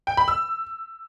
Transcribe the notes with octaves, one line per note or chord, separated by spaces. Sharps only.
G5
B5
E6